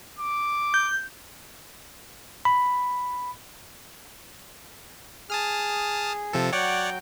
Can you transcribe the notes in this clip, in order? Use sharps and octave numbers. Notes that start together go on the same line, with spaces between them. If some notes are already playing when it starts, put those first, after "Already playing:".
D6
G6
B5
G#4 A5 D#6 F6
C3 F3 A4
F#3 C#5 D5 F#5 G5